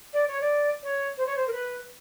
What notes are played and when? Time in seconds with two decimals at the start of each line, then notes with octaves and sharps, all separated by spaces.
0.13 D5
0.28 C#5
0.41 D5
0.83 C#5
1.17 C5
1.27 C#5
1.36 C5
1.47 A#4
1.52 B4